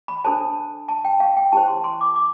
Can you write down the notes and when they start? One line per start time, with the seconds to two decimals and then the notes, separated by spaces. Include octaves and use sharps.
0.08 B5
0.24 D4 A4 C5 A5
0.88 A5
1.05 G5
1.20 F5
1.37 G5
1.52 E4 G4 C5 A5
1.68 C6
1.84 C6
2.01 D6
2.16 D6